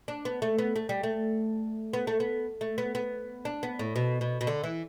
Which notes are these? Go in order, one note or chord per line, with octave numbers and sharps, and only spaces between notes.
D4
B3
A3
B3
A3
G3
A3
B3
A3
B3
A3
B3
B3
D4
B3
A2
B2
B2
B2
D3
E3